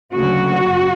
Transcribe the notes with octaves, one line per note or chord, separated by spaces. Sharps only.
D2 C#3 F#3 A#3 F#4
F#2 C#3